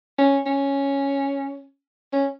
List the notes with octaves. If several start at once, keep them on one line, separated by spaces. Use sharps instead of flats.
C#4
C#4
C#4